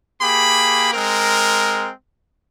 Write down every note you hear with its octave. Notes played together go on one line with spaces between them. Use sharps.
A#3 G4 G#4 B5
G#3 C4 A#4